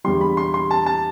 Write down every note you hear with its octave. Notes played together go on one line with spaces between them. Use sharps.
E2 D3 G3 C6
B5
C6
C6
A5
A5